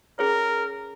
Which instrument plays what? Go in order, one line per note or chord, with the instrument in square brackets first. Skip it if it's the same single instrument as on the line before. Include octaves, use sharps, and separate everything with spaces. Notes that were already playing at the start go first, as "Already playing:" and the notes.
[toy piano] C#4 G#4 C#5 [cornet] A#4